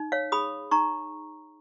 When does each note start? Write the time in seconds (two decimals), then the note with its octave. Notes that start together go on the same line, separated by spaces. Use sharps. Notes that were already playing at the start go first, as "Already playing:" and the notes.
Already playing: D#4
0.12 C#5 F5
0.32 G#4 B5 D#6
0.71 D#4 A#5 C#6